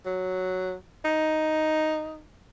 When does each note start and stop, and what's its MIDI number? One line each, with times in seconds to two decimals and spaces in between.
0.06 0.74 54
1.05 2.23 63